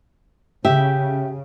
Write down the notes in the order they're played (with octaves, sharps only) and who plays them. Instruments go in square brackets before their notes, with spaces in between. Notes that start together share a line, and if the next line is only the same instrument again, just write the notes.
[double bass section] C#3 [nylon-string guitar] G4 E5